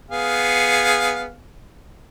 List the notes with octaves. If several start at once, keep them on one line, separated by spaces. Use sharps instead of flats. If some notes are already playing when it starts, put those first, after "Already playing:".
B3 G#4 F5